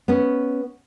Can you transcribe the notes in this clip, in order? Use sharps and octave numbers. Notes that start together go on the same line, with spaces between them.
B3 C#4